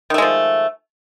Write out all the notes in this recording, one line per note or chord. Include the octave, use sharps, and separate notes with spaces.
D#3 F3 G#3 A3